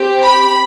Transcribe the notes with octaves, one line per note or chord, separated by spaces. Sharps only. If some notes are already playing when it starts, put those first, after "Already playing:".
Already playing: C4 G4
B5